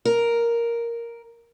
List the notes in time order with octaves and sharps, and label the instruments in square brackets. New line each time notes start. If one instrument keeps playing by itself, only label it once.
[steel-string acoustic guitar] A#4